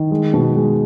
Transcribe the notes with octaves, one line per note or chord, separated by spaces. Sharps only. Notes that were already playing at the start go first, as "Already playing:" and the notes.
Already playing: D#3
G#3
B2
G#3